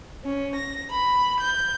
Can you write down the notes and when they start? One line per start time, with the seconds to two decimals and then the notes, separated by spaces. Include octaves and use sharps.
0.25 C#4
0.55 A#6
0.92 B5
1.40 G6